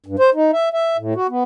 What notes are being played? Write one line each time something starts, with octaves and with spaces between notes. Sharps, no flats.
G2
C5
D#4
E5
E5
A2
F#4
B3